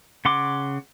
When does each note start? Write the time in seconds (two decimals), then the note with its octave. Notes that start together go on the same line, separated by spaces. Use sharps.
0.25 C#3 F#5 C6 D6